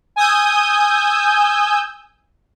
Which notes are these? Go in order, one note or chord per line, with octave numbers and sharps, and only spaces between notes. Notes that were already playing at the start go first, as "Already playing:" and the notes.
G#5 D#6 E6 G6